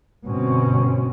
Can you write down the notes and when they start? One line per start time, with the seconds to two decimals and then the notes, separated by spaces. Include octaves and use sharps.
0.25 G1 G2 B2 C4 C#4